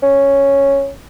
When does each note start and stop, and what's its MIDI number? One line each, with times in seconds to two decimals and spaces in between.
0.02 0.89 61